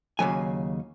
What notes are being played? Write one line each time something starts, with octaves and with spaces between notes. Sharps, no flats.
D#2 C#3 F#3 G#5